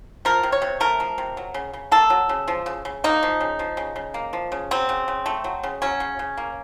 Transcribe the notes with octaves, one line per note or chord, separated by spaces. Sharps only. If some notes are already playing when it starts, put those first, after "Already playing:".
F3 A#4
C3
C#5
C3
A3 A#4
F3
C3
F#3
C#3
C#3
A#3 A4
F#3
C#3
F3
C#3
C#3
A#3 D#4
F3
C#3
F3
C#3
C#3
A#3
F3
C#3
F#3 C4
C#3
C#3
A3
F#3
C#3
F#3 C#4
C#3
C#3
A#3